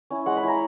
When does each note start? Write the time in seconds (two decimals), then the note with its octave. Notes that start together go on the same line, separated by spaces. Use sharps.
0.10 C#4 E4
0.26 G#3 F#5
0.37 B5
0.43 C#4 E4 A#5